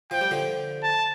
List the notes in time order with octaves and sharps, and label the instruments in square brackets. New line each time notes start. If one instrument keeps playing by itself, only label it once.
[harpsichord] F3 [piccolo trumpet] G5
[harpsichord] G3
D3 F3
[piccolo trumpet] A5